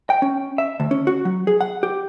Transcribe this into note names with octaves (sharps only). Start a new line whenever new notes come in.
G5
C#4
E5
D2
C#4
F#4
F#3
G#4
F#5
G4